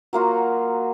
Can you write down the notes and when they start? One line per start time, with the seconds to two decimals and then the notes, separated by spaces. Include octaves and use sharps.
0.13 F#3 A#3 F4 F#4